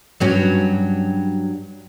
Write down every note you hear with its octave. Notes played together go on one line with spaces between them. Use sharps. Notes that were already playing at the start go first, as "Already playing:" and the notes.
G2 F#3 C#4